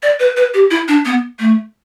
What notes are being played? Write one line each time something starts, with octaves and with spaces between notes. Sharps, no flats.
D5
B4
B4
G4
E4
D4
B3
A3